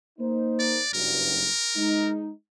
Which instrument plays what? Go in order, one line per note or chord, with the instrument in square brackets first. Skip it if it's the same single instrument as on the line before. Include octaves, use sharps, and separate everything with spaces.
[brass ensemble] A#3 D#4 C5
[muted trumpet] D5
[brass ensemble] F#1 G2 F#3 [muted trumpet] A#4
[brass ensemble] G#3 D#4